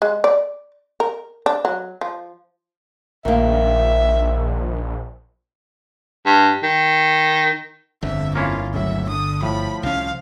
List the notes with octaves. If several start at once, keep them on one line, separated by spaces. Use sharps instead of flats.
G#3
D5
A#4
D4
F#3
F3
A#1 D#3 A#3 E5
G2
D#3
G1 F2 D3 E5
A#3 C#4 E4 F4
C#2 A2 F#3 E5
D3 D#6
A2 F3 B5
C2 C#4 F5